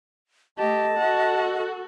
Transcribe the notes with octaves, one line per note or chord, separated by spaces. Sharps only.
A3 G4 D#5 A5
F#4 A4 F#5